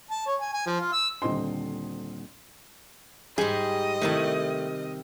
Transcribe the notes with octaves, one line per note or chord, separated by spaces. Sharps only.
A5
C#5
G#5
G#5
F3
F4
E6
D#1 D3 C4 D#5 C6
G#2 G3 G#4 D#5
C3 D#3 A3 E4 A5